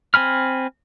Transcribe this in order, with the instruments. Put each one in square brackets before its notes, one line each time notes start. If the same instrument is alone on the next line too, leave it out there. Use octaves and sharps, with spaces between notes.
[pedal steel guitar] C4 G#5 B5 F6